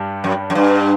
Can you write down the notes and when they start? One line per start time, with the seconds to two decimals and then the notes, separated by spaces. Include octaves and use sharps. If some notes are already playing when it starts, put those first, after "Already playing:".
Already playing: G2 G3
0.24 F#2
0.50 F#2
0.55 G2